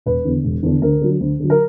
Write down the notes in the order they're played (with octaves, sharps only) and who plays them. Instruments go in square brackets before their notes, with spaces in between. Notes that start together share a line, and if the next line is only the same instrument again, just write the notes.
[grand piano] E1 B4
E2 D3
E1
E2 D3
D2 A#4
D3 F#3
D2
D3 F#3
A#4